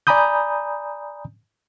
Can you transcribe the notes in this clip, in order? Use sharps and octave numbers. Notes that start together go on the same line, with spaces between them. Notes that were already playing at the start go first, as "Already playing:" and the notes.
D5 G#5 A#5 B5 D#6 G6